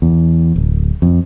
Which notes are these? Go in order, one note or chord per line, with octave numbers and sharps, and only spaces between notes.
E2
D1
F2